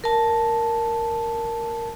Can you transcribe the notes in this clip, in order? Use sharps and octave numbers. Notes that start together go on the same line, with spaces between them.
A#4 A5